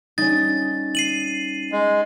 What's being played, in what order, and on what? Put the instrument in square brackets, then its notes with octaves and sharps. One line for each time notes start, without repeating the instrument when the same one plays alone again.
[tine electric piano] G3 C#4 [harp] D#4 [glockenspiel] A6
[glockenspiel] C7 D#7 F#7
[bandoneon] G#3